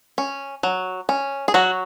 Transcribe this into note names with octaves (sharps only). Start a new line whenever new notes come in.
C#4
F#3
C#4
G#4
F#3 F#4